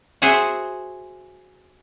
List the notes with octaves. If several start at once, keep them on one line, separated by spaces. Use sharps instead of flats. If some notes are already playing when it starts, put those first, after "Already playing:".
F#4 G#4 C5 E5